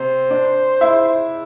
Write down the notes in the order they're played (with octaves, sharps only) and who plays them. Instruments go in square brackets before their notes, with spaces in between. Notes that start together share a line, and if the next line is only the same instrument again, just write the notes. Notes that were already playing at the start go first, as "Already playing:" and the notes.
Already playing: [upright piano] C3 C4 [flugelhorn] C5
[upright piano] D4 D5
E4 E5